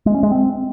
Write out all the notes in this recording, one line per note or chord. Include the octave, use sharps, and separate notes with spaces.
G#3
C#4
G#3
C4